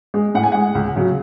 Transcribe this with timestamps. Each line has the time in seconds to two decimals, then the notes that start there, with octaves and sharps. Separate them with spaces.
0.14 G#3
0.34 A2 F#5
0.43 G#5
0.52 G#3 F#5
0.75 C#2
0.96 C#3 F#3